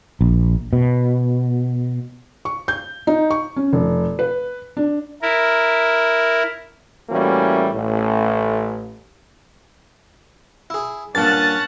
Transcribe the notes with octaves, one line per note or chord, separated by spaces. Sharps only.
A#1
B2
C#6
G6
D#4
C#6
C#4
F1
B4
D4
E4 A#4
A2 E3 G3 A#3 C#4 F#4
A1 A2
E4 G#4
G2 A#2 C#4 F#5 A5 A6